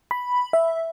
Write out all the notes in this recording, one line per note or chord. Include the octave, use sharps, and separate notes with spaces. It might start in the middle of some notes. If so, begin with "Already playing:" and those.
B5
E5